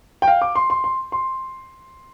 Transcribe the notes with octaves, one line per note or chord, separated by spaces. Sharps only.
G5
F5
D6
C6
C6
C6
C6